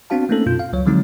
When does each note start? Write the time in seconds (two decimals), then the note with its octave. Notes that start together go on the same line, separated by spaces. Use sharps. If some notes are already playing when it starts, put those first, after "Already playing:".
0.10 B3 C4 D4 F#4 F5 A5
0.29 A3 A#3 C4 C#4 D#4 A4
0.46 F#2 B2 F4 G6
0.59 F5
0.73 C#2 F#3 C#5
0.86 D3 F3 F#3 G#3 C4 D#4